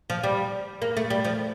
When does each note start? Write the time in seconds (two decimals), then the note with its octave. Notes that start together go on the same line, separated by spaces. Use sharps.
0.10 F3
0.23 G3
0.82 A#3
0.97 A3
1.10 G3
1.24 F3